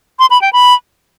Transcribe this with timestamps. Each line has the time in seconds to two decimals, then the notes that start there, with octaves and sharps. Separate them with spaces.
0.19 C6
0.30 B5
0.42 G5
0.53 B5